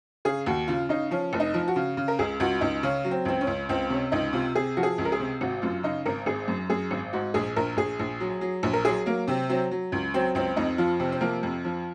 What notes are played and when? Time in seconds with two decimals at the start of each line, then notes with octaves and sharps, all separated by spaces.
0.25 C#3 G#4
0.46 D#2 F#4
0.68 C#3 F4
0.89 C#3 D#4
1.11 F3 C#4
1.33 F1
1.40 D#4
1.54 F3
1.68 F#4
1.76 C#3
1.97 C#3
2.08 A#4
2.19 C#2 G#4
2.40 C#2 F#4
2.61 C#2 D#4
2.83 C#3 C#4
3.05 F#3
3.11 C4
3.25 C#2 C4
3.41 C#4
3.47 C#2
3.69 C#2 C4
3.90 C3 C#4
4.12 C#2 D#4
4.33 C3 F4
4.55 C3 G#4
4.77 F3 F#4
4.83 G#4
4.98 C#2
5.05 A#4
5.12 G#4
5.20 C3
5.41 G#1 F#4
5.62 F#2 F4
5.83 C#3 D#4
6.06 G#1 A#4
6.26 G#1 G#4
6.48 F#2
6.70 F#2 G#4
6.91 G#1
7.13 G#2 F#4
7.34 A#1 G#4
7.56 A#1 A#4
7.77 A#1 G#4
7.99 A#1
8.20 F#3
8.41 F#3
8.63 A#1
8.73 A#4
8.85 F#3 G#4
9.06 F#3 A#3
9.28 C3 C4
9.49 F#3 C4
9.71 F#3
9.92 C#2
10.14 F#3 C4
10.35 C#2 C4
10.56 F2 D#4
10.78 F3 F4
10.99 C3 C4
11.12 C4
11.21 F3 A#3
11.43 F2
11.65 F3